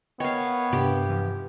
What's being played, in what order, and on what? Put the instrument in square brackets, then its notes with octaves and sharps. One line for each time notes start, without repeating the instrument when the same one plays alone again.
[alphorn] B3 [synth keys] A#4 D#5 G5 [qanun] C#5 F5
[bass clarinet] G2 [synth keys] C3 [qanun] G4
[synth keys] E3 F3